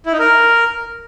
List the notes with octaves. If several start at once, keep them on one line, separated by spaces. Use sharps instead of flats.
E4
D#4
A#4